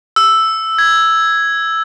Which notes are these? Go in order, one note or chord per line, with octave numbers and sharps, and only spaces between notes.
E6
G#6